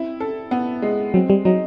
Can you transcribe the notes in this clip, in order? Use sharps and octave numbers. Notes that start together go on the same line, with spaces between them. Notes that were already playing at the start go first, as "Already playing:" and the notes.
Already playing: C4 E4
A4
B3
G#3
F#3 C4
G3
F#3 D#4